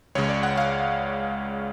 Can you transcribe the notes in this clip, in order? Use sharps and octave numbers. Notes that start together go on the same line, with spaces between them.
C#2 C#3 G#3 C#5
D5
F#5
F5